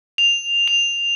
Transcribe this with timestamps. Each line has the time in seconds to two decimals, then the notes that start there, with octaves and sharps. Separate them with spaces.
0.18 F7
0.68 F7